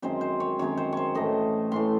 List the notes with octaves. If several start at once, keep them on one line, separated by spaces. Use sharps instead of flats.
F#2 D#3 G#3 C4 C5
C5
C#5
F#2 D#3 G#3 C4 C#5
C5
C5 C#5
A2 E3 A3 D#5
A2 E3 A3 C6